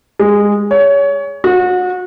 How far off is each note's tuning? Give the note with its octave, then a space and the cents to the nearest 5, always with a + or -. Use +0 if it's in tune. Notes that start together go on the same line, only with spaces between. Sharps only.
G#3 -15
C#5 +25
F#4 -30